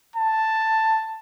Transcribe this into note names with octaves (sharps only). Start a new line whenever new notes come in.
A5